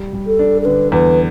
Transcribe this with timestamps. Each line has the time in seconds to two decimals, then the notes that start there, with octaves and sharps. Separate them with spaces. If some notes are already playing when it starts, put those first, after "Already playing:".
Already playing: G3
0.13 G3
0.27 A4
0.39 D4
0.62 A4
0.65 D3 B4
0.92 E2 B4